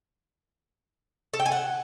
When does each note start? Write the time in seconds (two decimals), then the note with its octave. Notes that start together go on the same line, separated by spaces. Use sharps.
1.34 A4
1.40 G5
1.46 G#5
1.52 F#5